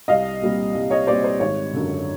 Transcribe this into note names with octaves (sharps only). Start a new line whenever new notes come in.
C2 D#5 F5
A#2 G3 C4
C2
C#5 D#5
A#2 G3 C4 C5 D5
C5
G#1 C#5
F#2 D3